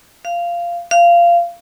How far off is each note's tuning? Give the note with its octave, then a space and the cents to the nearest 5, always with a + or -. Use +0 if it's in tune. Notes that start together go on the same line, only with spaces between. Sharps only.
F5 -15
F5 -20